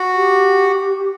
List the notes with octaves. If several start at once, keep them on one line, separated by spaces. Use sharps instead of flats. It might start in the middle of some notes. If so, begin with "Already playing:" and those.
Already playing: F#4
G4